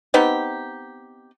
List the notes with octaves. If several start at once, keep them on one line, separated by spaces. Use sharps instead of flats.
B3 C4 D#4 G4